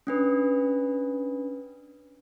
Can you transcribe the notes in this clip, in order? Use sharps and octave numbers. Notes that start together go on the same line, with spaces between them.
C#4 D4 B4